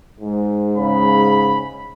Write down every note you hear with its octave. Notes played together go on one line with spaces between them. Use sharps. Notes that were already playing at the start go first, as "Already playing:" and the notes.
G#2
C#3 B5